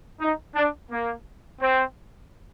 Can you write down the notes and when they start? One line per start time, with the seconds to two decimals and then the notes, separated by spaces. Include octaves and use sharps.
0.21 D#4
0.56 D4
0.92 A#3
1.62 C4